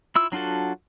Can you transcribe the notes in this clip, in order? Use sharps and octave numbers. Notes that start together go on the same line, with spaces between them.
E4 F4 E6
F#3 D4 F4 F#4 A4